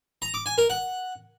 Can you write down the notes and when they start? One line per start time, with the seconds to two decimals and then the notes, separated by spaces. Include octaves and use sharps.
0.22 A#5
0.34 D6
0.46 G#5
0.58 A#4
0.70 F#5